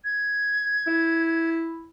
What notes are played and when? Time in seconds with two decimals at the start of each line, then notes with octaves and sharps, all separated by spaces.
0.05 G#6
0.87 E4